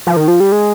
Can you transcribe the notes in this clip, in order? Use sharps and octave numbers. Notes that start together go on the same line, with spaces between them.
F3
D#3
F3
G3
G#3